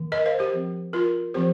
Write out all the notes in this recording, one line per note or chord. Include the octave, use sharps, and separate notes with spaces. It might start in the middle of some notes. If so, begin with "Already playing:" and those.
Already playing: D#3 A#3
A#4 D#5
C5 F5
G4 C5
F3 C4
F4 A#4
F3 C4 G4 C5